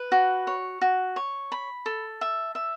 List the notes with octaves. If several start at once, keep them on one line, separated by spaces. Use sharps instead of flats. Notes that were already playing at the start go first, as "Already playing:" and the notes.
Already playing: B4
F#4
C#5
F#4
C#5
B5
A4
E5
E5